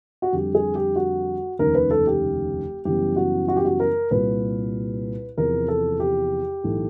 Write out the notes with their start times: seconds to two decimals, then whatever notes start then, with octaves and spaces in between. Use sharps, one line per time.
0.22 F#4
0.33 F2 D3 G3 G4
0.55 G#4
0.75 G4
0.96 F#4
1.59 F1 D#2 C#3 A#4
1.75 B4
1.91 A4
2.07 G4
2.85 F#2 C#3 E3 G3 B3 G4
3.16 F#4
3.48 F#4
3.56 G4
3.65 F#4
3.80 A#4
4.11 C2 A#2 G3 B4
5.38 E2 C3 F3 A#4
5.68 A4
6.00 G4
6.64 B1 A2 E3 A3